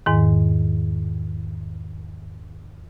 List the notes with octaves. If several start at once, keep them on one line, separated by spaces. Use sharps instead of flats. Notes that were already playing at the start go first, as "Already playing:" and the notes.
E2 G#2 D#3